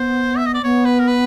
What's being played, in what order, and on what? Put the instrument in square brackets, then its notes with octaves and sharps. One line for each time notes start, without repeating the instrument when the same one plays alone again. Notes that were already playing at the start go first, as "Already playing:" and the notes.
Already playing: [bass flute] B3 [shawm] C5
[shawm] E5
D#5
D5
[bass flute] B3 [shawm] C#5
[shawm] B4
A#4
B4